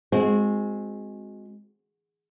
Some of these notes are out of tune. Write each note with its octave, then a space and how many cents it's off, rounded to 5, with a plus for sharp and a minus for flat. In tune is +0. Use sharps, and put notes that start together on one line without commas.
G#3 +0 C4 +0 F#4 -30